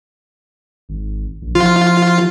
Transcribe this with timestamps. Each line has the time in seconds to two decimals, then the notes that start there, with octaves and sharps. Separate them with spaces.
0.89 G#1
1.42 A#1
1.55 F3 F4